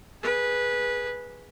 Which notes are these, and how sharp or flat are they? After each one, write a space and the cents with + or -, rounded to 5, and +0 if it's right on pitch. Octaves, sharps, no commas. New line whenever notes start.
G#4 +0 B4 -15